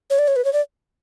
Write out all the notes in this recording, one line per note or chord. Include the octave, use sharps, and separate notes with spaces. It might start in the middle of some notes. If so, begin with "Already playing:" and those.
C#5
D5
C#5
B4
C#5
D5